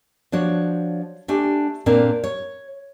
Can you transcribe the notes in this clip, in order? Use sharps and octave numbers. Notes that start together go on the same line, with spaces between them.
F3 D4 F#4 C#5
A3 D4 G4 G#5
A#2 A#3 C4 D4 A4
C#5